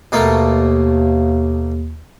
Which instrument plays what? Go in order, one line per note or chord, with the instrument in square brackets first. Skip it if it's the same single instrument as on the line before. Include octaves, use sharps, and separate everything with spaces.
[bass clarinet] D#2 [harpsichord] B2 A3 A#3